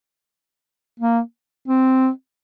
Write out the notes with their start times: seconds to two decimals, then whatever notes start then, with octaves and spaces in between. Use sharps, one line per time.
1.00 A#3
1.68 C4